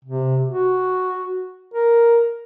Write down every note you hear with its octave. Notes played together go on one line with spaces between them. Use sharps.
C3
F#4
A#4